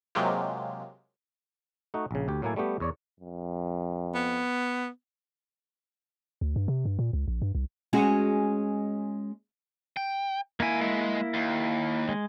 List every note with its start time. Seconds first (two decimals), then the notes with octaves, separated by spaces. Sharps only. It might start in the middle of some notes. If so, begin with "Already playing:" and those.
0.15 C3 F#3 G#3 A#3 F4 G4
1.94 A3 D#4 F#4
2.11 A#1 C#3
2.28 D2 G4
2.42 A2 F#3 A#3 E4 G#5 A5
2.56 G3 A3 B3 G4
2.80 E2 C#5 D5
3.20 F2
4.15 B3
6.41 D2
6.56 G2
6.68 C3
6.85 G2
6.99 A#2
7.13 C#2
7.28 A#1
7.42 G2
7.55 C2
7.93 G#3 C#4 F#4
9.97 G5
10.60 D#3 A#3 E4 G#5
10.81 G#3
11.34 D#2
12.09 G#3